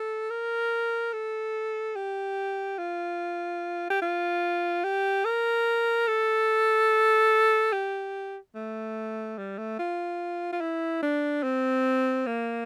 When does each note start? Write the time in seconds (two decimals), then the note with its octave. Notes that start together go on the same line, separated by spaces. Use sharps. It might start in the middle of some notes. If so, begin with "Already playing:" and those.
Already playing: A4
0.30 A#4
1.13 A4
1.96 G4
2.78 F4
3.90 G4
4.02 F4
4.84 G4
5.25 A#4
6.08 A4
7.72 G4
8.55 A3
9.38 G3
9.58 A3
9.79 F4
10.53 F4
10.61 E4
11.02 D4
11.43 C4
12.26 A#3